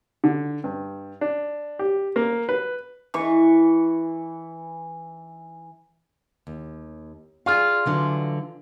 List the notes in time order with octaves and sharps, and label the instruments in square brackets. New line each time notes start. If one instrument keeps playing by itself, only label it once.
[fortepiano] D3
G2
D4
G4
A#3
B4
[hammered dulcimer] E3 C#6
[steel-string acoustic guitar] D#2
[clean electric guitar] F4 [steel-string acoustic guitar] G#4 D5 F5
[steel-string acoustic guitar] D3 E3 F#3